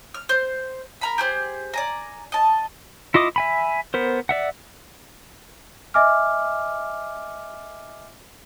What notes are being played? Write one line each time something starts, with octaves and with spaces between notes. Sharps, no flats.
F6
C5
A#4 A#5 B5
G4 G#4 C5
D5 G#5 A#5
D#5 A5
E4 F4 D#5 D6 D#6
E5 G#5 B5
B3 A#4 C5
D5 E5 F#5
D#5 E5 G#5 D6 F6